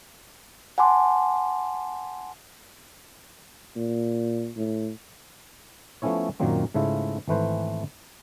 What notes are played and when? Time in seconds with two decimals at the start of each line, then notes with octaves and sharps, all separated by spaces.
0.78 F#5 G#5 A5 C6 D6
3.76 A#2
4.57 A2
6.02 F3 A3 B3 C#4 E4 C#5
6.40 F#2 A#2 D#3 F#3 A#3 C4
6.74 G#2 C#3 A3 E4 F4
7.28 G#1 E3 A3 B4 C5